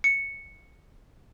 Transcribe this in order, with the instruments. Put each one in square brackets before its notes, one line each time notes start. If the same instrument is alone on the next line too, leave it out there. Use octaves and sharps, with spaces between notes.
[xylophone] C#7